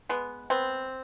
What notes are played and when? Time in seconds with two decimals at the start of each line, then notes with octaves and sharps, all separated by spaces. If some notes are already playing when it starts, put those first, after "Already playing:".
0.09 G#3 B3
0.50 B3 C4